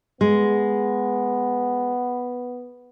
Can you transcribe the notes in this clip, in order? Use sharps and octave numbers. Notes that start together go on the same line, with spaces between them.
G#3 B3